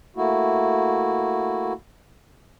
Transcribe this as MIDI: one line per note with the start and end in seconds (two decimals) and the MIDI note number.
0.17 1.73 57
0.17 1.73 58
0.17 1.73 64
0.17 1.73 66